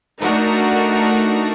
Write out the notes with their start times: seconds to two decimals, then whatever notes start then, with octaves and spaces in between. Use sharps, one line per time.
0.19 A3 D4 D#4 F#4 A#4